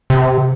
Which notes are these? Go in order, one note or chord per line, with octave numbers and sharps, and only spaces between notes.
C3